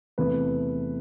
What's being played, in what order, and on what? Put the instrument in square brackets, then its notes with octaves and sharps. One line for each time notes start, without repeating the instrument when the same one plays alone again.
[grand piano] E2 C3 E3 A3 B4